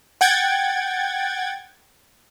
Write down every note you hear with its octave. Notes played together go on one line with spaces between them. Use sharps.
F#5 G5 G#6 A6